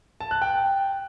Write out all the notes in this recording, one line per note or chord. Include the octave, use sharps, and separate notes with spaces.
A5
F#6
G5